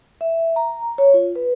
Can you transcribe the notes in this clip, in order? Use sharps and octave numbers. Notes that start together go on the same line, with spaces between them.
E5
A#5
C#5
F4
B4